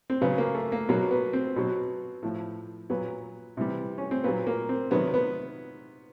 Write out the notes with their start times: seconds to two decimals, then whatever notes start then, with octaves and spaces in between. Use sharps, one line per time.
0.10 C4
0.21 C#3 F#3 B3
0.38 A#3
0.55 A3
0.72 A#3
0.89 B2 F#3 A#3
1.11 B3
1.33 C4
1.56 B2 F#3
2.23 A2 F3
2.90 A#2 F#3 B3
3.57 C3 E3 G3
3.98 C#4
4.11 C4
4.24 A#2 F#3 B3
4.47 A#3
4.69 C4
4.91 C3 D#3 F#3 B3
5.14 B3